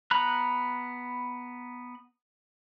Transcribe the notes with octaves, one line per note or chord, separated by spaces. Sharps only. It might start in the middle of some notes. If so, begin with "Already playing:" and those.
B3 A#5 B5 F#6